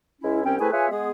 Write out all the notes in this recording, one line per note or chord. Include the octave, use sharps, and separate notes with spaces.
C#2 G#3 C#4 E4
C2 G3 C4 C#4 G5
A3 C4 E4 G#4 B4 G#5
F4 G#4 B4 C#5 E5 G#5
G#3 B3 G#4